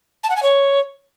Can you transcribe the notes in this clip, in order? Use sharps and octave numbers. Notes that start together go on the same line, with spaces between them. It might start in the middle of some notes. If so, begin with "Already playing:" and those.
A5
F#5
G#5
C#5